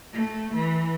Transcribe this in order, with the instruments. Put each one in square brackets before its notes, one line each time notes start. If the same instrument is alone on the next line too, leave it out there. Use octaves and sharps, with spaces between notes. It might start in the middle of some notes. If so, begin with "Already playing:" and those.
[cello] A3
E3